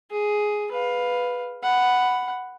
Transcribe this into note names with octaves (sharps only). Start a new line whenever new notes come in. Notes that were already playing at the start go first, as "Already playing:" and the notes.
G#4
B4 F5
F#5 B5